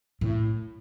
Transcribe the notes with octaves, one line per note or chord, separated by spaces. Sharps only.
A2